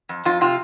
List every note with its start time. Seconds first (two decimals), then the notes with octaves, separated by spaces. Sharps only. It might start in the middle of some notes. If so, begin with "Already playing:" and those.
0.09 F2
0.25 F2 F4
0.41 C3 F4